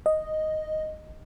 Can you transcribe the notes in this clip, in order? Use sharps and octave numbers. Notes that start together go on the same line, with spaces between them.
D#5